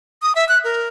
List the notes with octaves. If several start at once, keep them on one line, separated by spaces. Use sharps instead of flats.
D#6
E5
F#6
A#4